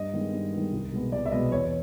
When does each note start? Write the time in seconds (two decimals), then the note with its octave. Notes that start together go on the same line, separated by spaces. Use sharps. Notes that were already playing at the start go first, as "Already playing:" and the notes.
Already playing: G2 D#5
0.13 D#3 G#3 B3
0.33 G2
0.52 D#3 G#3 B3
0.72 C2
0.92 B2 G#3 B3
1.12 C2 D5
1.26 E5
1.31 B2 G#3 B3 D#5
1.51 E2 C#5